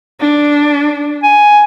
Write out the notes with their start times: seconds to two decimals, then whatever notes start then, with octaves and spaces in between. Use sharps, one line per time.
0.20 D4
1.23 G#5